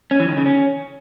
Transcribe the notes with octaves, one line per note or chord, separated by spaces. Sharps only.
C#4
E3
D#3
C#3
C#4